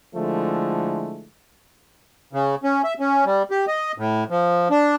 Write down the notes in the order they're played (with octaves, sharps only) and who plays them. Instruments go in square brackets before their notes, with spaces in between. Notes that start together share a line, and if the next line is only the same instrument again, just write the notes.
[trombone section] D3 F3 G#3 A3 E4
[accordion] C#3
C#4
E5
C#4
G3
G4
D#5
A2
F3
D4